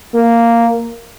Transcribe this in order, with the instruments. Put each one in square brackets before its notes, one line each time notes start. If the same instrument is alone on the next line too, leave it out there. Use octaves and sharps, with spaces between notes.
[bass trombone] A#3